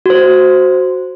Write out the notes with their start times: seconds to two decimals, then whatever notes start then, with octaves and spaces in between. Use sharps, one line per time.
0.06 F#4 C5